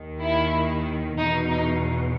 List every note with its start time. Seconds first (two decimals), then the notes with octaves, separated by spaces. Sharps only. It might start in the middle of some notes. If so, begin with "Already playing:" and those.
Already playing: D#2 D#3
0.22 E4
1.17 E2 B2 D#4
1.49 D#4